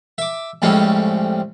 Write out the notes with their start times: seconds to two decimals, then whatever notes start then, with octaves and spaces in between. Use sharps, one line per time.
0.18 E5 D6
0.62 F2 A2 G3 G#3 C4 C#4